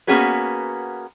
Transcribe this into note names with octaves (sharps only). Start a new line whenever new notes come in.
A#3 B3 C#4 F#4 G#4 B4